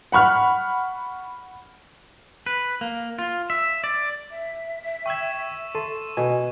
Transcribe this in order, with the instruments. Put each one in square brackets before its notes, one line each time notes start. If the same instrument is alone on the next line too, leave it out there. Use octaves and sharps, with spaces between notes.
[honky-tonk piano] F#5 B5 C#6 F6
[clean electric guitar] B4
A#3
F4
E5
D5
[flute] E5
[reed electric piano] G5 G#6 [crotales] C#6 E6 E7
[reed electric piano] A4 A5 C6 [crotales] D#7
[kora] B2 [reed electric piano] G#5